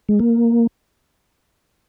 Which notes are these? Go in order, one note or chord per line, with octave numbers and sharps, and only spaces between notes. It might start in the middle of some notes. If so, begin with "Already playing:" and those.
G#3
A#3